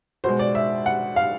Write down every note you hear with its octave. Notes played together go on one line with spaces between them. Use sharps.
B2 G#3 C5
D5
E5
F#5
F5